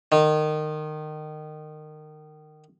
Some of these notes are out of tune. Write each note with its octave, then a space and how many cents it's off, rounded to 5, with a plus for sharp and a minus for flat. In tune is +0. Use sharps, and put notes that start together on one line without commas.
D#3 -25